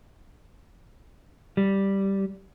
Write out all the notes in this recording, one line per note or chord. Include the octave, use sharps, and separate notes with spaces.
G3